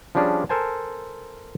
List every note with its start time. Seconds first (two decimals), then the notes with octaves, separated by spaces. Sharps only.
0.15 F3 G3 C#4 D4 G#4
0.49 A4 A#4 C5 G#5 A5